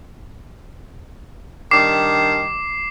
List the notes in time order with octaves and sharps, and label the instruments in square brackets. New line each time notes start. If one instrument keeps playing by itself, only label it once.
[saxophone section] D#3 G3 D4 [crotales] D6 C7